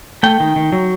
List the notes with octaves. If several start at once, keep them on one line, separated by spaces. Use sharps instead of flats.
A3 G5
D#3
D#3
F#3